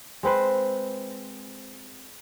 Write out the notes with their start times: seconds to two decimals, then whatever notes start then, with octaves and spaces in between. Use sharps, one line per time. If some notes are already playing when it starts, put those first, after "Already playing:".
0.23 G#3 C4 B4 C5